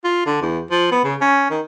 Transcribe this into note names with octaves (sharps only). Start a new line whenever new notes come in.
F4
D3
E2
F3
B3
C#3
C#4
D#3